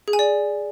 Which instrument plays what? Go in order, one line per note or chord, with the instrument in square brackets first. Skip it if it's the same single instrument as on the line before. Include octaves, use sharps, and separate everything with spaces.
[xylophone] G#4
G#5
D5